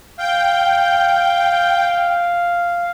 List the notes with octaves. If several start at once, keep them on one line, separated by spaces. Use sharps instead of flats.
F5 G5